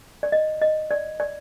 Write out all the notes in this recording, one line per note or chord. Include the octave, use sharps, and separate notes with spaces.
D5
D#5
D#5
D5
D5